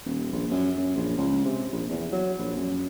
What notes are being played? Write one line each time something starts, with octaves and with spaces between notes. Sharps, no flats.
D#1
A#1
F#2
F#2
A#1
C#2
C3
A#1
E2
F#3
A#1
F#2